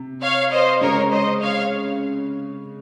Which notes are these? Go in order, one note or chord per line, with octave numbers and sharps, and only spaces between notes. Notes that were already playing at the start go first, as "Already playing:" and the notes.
Already playing: C3
C#5 F5
C5 D#5
C#3 G#3 C#4 A#4 C#5
C5 D#5
C#5 F5